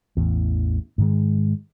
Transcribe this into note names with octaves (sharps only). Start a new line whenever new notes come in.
A1 E2
G#2 D#3 G#3